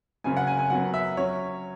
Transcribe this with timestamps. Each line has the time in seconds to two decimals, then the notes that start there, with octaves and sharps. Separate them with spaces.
0.24 F#1 F#2 C#3 G#5
0.37 F#5
0.47 G#5
0.59 G#5
0.70 F#2 F#3 B3 F#5
0.94 E5
1.17 F#3 C#4 C#5